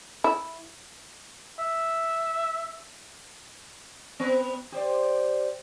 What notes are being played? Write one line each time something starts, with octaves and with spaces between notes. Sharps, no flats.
E4
E5
B3 B4
G4 C5 D5